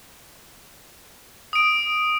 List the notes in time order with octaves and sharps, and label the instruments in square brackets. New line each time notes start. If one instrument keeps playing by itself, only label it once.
[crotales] D#6 D7